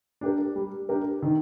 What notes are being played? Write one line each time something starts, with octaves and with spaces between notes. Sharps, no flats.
D4 G4 A#4
G3
D4 G4 A#4
D#3